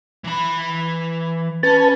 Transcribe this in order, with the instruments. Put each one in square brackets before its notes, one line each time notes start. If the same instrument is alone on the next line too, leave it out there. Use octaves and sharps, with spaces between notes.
[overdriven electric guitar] E3 B5
[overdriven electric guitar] C#4 [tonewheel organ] B4 A5